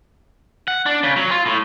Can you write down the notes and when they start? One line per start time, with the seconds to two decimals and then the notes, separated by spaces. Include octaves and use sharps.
0.68 F#5
0.86 D4
1.03 C#3
1.16 F#3
1.31 F4
1.46 A2